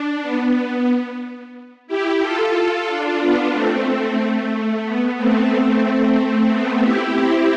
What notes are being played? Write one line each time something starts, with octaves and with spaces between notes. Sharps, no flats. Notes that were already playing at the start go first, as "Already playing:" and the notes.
Already playing: D4
B3
E4 G4
F4 A4
D4 F4
B3 D4
A3 C4
A3
B3
A3 C4
A3 C4
B3
E4 G4
C4 E4